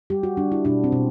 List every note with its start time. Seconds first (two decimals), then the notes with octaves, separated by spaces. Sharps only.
0.10 G3 G4
0.23 F#4
0.37 G3 D4
0.52 E4
0.65 B2 D4
0.84 C4
0.92 B2